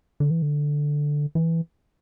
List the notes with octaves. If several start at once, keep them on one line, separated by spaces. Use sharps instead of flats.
D3
E3
D3
E3